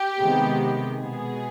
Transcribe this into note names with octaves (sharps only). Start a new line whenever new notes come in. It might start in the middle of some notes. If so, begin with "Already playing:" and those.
Already playing: G4
C3 D#3 G#3 B3
B2 G#3 B3 G#4